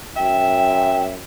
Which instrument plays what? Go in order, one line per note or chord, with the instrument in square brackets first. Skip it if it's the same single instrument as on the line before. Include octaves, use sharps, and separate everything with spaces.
[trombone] F#2 [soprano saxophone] E5 [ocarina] G5